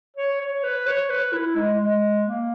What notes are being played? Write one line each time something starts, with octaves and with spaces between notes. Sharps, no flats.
C#5
C#5
B4
C#5
B4
E4
G#3
G#3
A#3